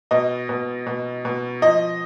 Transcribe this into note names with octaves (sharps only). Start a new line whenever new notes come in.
B2 D#5
B2
B2
B2
F3 D#5